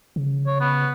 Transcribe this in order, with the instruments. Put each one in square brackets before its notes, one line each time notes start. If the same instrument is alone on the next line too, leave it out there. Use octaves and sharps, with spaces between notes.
[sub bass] C#3
[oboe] C#5
B3